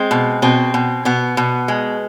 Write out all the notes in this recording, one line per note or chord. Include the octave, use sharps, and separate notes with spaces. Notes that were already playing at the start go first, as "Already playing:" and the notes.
Already playing: G#3 C4
B2
B2 C4
B2
B2 B3
B2
G#3